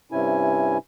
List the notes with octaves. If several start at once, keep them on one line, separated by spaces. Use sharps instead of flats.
G2 C3 C#4 E4 G#5